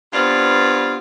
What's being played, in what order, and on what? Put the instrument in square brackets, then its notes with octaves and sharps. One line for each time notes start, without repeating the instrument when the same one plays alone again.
[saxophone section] G2 B3 C4 F4 D5 F5